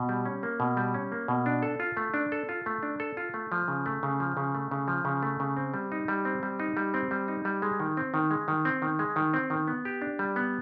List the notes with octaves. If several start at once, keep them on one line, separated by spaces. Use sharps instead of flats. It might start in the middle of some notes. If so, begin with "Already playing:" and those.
Already playing: B2
G3
C#4
A#3
B2
G3
C#4
A#3
B2
D4
A4
F4
A3
D4
A4
F4
A3
D4
A4
F4
A3
F3
C#3
A3
C#3
F3
C#3
A3
C#3
F3
C#3
A3
C#3
C4
G3
D#4
G3
C4
G3
D#4
G3
C4
G3
D#4
G3
G#3
D#3
C4
D#3
G#3
D#3
C4
D#3
G#3
D#3
C4
D#3
B3
G4
D4
G3
B3